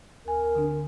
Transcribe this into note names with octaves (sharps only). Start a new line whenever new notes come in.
D2 A#4 G#5
D3 D4